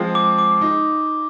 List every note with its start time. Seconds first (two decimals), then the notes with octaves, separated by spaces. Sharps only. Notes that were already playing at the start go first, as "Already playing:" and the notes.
Already playing: F3 G#3 C4 F4
0.15 D6
0.38 D6
0.61 D#4